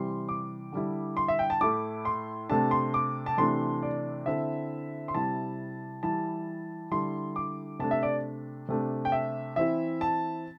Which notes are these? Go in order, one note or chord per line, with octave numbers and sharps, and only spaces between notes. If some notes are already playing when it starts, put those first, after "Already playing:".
Already playing: C3 E3 G3 C6
D6
D3 G3 E4
C6
E5
G5
A5
A2 A3 E4 D6
C6
C3 A3 D4 A5
C6
D6
A5
C3 E3 A3 D4 C6
D5
D3 C4 E4 E5
C6
C3 G3 E4 A5
E3 G3 E4 A5
D3 G3 E4 C6
D6
C3 A3 D4 A5
E5
D5
C3 A3 D4
G5
E5
E3 C4 E4 E5
A5